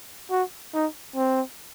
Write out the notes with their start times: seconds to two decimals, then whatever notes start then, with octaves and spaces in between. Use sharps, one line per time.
0.30 F#4
0.74 D#4
1.16 C4